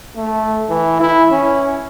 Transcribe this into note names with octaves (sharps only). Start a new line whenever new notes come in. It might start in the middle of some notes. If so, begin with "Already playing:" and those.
A3
E3
E4
C#4